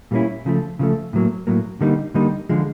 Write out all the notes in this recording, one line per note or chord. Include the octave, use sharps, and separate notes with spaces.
A#2 G3 A#3 C#4 E4
C#3 F3 A3
C#3 F3 A3
A2 F#3 A#3
A2 F#3 A#3
D3 G3 A#3 D#4
D3 G3 A#3 D#4
D3 F3 G#3